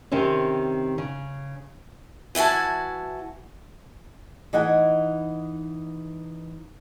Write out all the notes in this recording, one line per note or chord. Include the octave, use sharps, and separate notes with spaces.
C3 D#3 C4 C#4
C#3
E3 E4 F#4 G#5 A5
E3 D#4 D#5 F#5 G#5